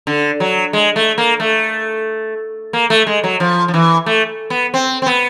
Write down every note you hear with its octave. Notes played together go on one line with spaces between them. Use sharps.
D3
F#3
G#3
A3
A#3
A3
A#3
A3
G#3
F#3
F3
F3
E3
A3
B3
C4
C4
B3